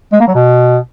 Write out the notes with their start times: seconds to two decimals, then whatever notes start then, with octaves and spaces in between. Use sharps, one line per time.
0.13 G#3
0.20 A#3
0.27 F#3
0.35 B2